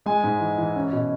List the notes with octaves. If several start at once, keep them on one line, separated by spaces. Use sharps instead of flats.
G#3 G#5
G#2
E3
E3
C#4
B2